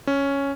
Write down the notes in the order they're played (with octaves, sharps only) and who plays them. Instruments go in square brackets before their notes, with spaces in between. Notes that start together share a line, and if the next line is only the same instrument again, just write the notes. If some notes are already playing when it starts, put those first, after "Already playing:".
[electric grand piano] C#4